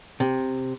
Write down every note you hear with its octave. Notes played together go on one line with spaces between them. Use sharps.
C3